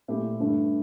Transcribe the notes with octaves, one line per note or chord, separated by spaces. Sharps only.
A#2 A3 E4 G4
G2 D3 A3 E4